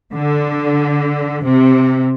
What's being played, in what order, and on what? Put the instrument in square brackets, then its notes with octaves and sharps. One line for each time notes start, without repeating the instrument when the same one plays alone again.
[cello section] D3
C3